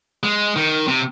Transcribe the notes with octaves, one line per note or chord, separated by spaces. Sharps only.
G#3
D#3
C3